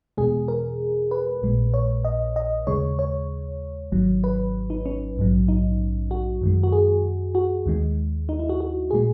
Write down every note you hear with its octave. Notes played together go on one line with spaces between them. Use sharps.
E2 B2 G#3 G#4
A#4
B4
A#1 A#2 G#3
C#5
D#5
D#5
D#2 C#3 G#3 C#5
C#5
G#1 G#2 D#3 F#3
B4
D#4
C#4
A#1 G#2 F#3
D#4
F#4
F#2 D#3 G#3
F#4
G#4
F#4
D#2 D#3 G#3
D#4
E4
F#4
F#4
A#2 G#3 G#4